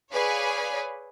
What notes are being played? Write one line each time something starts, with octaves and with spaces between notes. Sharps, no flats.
G#4 B4 C#5 D5 F5 G#5